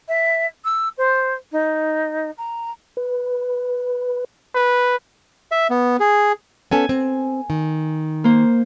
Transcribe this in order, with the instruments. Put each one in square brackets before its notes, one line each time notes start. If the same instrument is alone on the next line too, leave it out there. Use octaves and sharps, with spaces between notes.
[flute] E5
E6
C5
D#4
A#5
[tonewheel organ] B4
[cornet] B4
[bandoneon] E5
B3
G#4
[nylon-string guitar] B3 C#4 A4 [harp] G#5
[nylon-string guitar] C4
D#3
[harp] A#3 C5